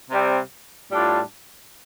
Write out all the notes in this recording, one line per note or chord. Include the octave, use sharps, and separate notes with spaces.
C3 G3 C4
A2 G3 D4 F4